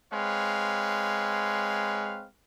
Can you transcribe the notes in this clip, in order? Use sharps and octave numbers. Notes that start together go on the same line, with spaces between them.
G#3 C4 B4 C#5 F5